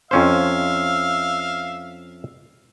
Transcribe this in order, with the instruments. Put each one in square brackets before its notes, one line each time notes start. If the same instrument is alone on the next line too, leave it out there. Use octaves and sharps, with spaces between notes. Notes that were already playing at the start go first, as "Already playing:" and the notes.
[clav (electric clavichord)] F2 C#4 C5 [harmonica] E5 F5